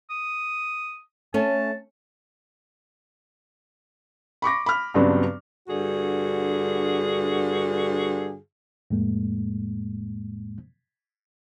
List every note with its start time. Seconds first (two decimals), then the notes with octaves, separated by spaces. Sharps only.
0.10 D#6
1.34 A3 C#4 A5
4.42 B5 C#6 D6 A#6
4.66 B5 F6
4.94 G2 C#3 F#3 B3 C4 D4
5.68 G2 D3 F#4 G#4
8.90 F2 A2 G#3 A#3